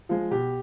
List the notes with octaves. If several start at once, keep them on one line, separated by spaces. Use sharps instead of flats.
F3 G#3
B2 G4